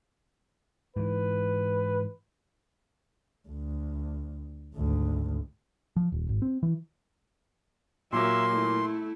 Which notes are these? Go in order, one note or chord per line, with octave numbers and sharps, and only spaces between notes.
G#2 E3 B4
D2
G#1 D2
F3
D#1
G#1
C4
E3
A#2 F#3 A#3 E5 C6
A3 E4